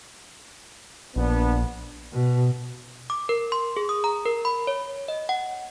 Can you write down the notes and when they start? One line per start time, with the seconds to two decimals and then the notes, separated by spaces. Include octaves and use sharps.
1.16 A#1 B3 D4
2.12 B2
3.10 D6
3.29 A#4
3.52 C6
3.77 G#4
3.89 D#6
4.04 A#5
4.26 A#4
4.45 B5
4.67 C#5
5.08 D#5
5.29 F#5